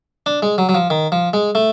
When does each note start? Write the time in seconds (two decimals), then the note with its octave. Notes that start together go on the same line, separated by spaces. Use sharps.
0.26 D4
0.42 G#3
0.58 F#3
0.69 F#3
0.75 F3
0.90 D#3
1.12 F3
1.33 G#3
1.55 A3